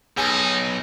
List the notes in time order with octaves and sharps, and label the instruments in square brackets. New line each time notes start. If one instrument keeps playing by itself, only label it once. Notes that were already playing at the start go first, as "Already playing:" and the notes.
[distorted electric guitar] B1 [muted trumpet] D#4 [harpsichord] G#4